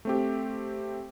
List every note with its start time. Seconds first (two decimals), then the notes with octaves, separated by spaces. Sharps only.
0.05 A3 C4 G4